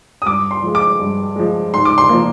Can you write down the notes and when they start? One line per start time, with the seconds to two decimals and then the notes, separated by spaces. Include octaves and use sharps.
0.22 D#6
0.26 G2 D6
0.51 C6
0.63 F3 G#3
0.75 D6
1.00 G2
1.36 F3 G#3
1.74 G#2 C6
1.85 D6
1.98 C6
2.09 F3 A#3